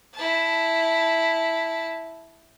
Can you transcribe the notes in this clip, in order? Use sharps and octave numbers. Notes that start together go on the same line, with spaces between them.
E4 A5